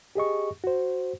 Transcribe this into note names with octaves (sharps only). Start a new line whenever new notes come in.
G4 G#4 D#5 C#6
F#4 C5